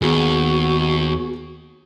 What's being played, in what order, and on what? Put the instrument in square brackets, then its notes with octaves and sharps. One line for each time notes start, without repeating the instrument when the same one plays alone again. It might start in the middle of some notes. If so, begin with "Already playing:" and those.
[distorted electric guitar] D#2 [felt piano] B3 G#4 [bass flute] F#4